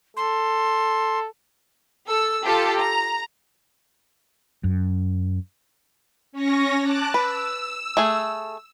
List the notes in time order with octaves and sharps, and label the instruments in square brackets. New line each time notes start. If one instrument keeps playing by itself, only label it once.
[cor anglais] A4 [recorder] C6
[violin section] A4 E6
F4 G4 A4 A5
A#5
[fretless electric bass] F#2
[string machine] C#4 C#5 A#6
A5 D6 F#6
[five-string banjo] B4 [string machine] E6
[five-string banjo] A3 G#4